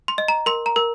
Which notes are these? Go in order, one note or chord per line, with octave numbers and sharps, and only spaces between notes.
C6
D#5
A#5
A#4 C6
A#5
A#4